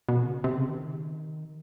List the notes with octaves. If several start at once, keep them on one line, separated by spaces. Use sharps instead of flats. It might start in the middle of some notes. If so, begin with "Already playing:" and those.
B2
C#3
C3
C#3
D#3